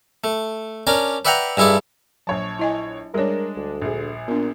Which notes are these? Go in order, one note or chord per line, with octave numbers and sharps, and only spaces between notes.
A3
C#4 D4 A#4 D5
B4 D5 E5 F#5 G5 A#5
G2 G#3 E4 A4 D5
A#1 F#3 C#5 A5
E4 D#5 G#5
G3 G#3 D4 A#4 C#5
D2
A#1 G#4
A#2 B3 D4